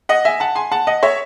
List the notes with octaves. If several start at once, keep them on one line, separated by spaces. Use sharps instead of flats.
D#5 F#5
E5 G#5
F#5 A5
G#5 C6
F#5 A5
D#5 F#5
C#5 E5